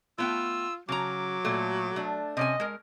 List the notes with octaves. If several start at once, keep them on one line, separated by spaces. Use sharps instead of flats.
A3 B3 F4 G5 E6
C#3 F#3 A#5 D6
A#2 A3
A3 D4
C3 C#4 D#5 G#5
G#3 A#4